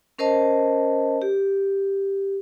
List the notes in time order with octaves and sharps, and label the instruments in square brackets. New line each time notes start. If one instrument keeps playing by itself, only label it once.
[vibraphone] C#4 A#4 C5 D#5 A5
G4